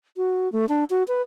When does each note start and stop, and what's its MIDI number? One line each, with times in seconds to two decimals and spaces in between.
0.17 0.51 66
0.52 0.65 57
0.69 0.84 62
0.90 1.03 66
1.08 1.22 71